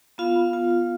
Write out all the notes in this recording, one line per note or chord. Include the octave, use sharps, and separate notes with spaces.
B3 F4 F5
B3
F4
F4